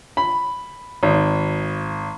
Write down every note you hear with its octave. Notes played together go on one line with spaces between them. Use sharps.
B5
G#1